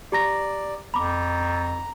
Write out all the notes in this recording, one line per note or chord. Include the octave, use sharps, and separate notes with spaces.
G4 D5 A#5 A#6
F2 A#5 B5 D6